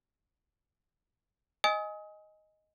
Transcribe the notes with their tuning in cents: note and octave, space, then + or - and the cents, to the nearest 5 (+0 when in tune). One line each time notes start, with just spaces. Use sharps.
D#5 +0 G#5 +0 D#6 +35